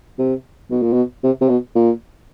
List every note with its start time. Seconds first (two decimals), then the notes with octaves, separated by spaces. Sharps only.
0.19 C3
0.70 B2
0.82 A#2
0.93 B2
1.23 C3
1.41 C3
1.49 B2
1.75 A#2